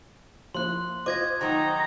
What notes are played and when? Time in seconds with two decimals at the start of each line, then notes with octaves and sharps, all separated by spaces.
0.55 F3 A#3 E4 C6 F#6
1.06 F4 C5 D#5 D6 G#6 A#6
1.41 D#3 F#3 A3 D#4 A#5